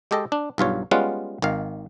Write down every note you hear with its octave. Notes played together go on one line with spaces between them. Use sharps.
G#3 G4 A4 D#5 G5
D4
B1 G2 F4 C#5
G3 G#3 B3 C#4 F4 F#5
G#1 D#3 F5